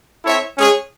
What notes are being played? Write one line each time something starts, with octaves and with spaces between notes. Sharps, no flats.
C4 E4 A4 C#5 E5
G#3 C#4 G#4 C#5